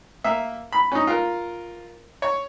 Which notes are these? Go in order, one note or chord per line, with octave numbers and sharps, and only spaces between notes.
A#3 E5
B5
C#4 D#4
F4 A#4
C#5